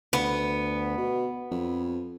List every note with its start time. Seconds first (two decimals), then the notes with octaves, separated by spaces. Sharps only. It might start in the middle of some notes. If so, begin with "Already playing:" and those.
0.13 D2 B3
0.98 B2
1.51 F2